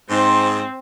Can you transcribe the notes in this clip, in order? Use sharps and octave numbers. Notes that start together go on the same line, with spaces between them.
G#2 C4 C6